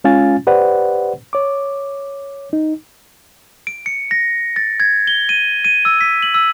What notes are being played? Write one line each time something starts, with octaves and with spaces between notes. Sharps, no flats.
G#3 C#4 F4 F5 G#5 A6
G4 B4 C5 D5 F#5
C#5 D6
D#4
D7
C#7
A#6
A6
G#6
G7
D#7
D#7
E6
B6
F#7
E6